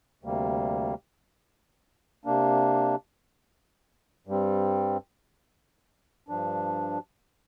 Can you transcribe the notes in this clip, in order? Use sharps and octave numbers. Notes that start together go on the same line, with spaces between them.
D2 C3 G3 A#3
C3 A#3 D4
G2 G3 C4
G2 F3 D4